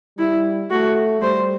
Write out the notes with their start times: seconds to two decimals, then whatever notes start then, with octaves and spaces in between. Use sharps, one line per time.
0.18 G3 E4
0.71 A3 F#4
1.22 G3 C5